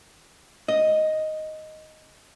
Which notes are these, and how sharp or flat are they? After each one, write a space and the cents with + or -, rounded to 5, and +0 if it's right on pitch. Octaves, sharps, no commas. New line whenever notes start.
D#5 +0